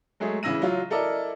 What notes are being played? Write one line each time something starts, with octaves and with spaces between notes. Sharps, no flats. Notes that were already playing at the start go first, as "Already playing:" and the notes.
F#3 G#3 A3 G#4
C#3 E3 E4 E6 A#6 D#7
F#3 F4
E4 A4 A#4 D5 D#5